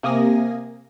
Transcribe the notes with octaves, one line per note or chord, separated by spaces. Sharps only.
C3 A#3 G#5 D#6 A#6